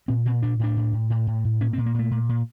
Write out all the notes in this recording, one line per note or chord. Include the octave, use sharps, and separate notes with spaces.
A#2 C4
A#2 C4
A#2 D4
A2 D4
A2
A2
A2
A2
A2
A#2 C#4
C4
A#2
A#3
A#2 A3
A#2
A#2